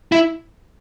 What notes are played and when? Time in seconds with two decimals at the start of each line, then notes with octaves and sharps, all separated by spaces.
0.12 E4